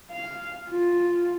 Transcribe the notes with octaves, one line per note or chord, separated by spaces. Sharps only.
F5
F4